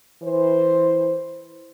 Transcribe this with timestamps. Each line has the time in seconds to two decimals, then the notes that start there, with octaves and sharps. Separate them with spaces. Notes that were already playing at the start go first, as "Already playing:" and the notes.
0.22 E3 C5